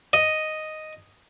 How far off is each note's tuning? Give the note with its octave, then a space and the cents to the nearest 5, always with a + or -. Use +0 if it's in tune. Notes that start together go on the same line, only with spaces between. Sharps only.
D#5 +0